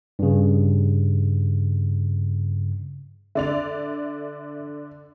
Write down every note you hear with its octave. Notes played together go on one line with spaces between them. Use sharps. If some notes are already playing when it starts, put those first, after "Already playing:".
G2 C#3
D3 D5 E5 F7